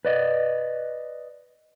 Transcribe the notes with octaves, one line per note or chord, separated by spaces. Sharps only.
B4 D5 D#5